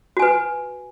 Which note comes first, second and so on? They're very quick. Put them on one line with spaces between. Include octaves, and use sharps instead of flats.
F#4 G#5 B4